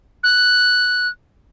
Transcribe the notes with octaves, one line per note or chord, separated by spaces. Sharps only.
F#6